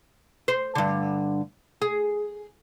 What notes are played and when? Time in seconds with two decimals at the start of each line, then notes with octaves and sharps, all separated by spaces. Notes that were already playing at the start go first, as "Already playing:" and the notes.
0.48 C5
0.75 G2 D3
1.82 G#4